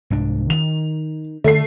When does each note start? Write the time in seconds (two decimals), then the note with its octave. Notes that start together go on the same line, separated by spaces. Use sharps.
0.10 C2 G#2 D4
0.50 D#3 F7
1.44 D3 A3 C7